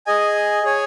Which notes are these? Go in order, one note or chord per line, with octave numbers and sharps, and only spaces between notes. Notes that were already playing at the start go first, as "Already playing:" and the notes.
G#4 D#5 G#5
G#4 C#5 G#5